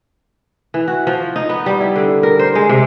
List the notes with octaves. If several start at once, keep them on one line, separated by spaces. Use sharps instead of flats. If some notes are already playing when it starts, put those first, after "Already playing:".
E3
F#4
F3
D#4
B3
G3
E4
D3
A#4
C5
G#3
C3